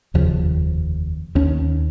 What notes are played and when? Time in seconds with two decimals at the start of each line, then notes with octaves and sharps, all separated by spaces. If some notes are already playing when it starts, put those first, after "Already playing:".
0.14 F1 D#2 C#3 F3
1.35 D#2 D#3 C#4